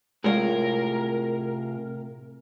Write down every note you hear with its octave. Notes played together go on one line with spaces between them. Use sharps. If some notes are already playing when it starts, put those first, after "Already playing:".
A2 C3 G#3 F4 G#4 A#4 C#5 F5